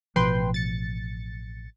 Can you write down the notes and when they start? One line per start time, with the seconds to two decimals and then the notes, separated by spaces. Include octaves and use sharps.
0.16 A1 B2 F3 B4 G5 C6
0.54 A6 C#7